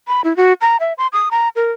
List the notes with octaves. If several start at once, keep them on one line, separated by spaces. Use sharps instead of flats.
B5
E4
F#4
A#5
E5
C6
D#6
A#5
A#4